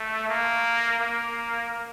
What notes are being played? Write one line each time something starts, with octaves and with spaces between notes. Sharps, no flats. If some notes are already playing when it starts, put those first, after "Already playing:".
Already playing: A3
A#3
A#3